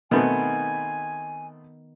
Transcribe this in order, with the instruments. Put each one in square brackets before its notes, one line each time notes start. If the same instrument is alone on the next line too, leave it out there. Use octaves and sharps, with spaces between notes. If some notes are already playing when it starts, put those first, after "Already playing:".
[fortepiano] B2 A3 C4 [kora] D#3 B3 [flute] G#5